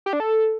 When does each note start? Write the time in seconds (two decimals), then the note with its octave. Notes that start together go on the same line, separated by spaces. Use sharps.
0.06 G4
0.13 D4
0.20 A4